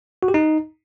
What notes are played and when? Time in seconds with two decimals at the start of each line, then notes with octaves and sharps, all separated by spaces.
0.23 F#4
0.28 G4
0.34 D#4